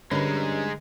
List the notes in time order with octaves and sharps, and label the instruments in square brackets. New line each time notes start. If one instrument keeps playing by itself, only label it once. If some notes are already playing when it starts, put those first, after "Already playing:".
[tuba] G2 [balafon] D3 B4 B5 [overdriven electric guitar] G#3 D#4 [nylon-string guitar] C#4